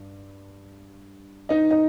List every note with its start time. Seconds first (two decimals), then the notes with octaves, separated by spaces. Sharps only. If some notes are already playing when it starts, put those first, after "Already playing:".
Already playing: G2
1.49 D#4 D#5
1.71 D#4 D#5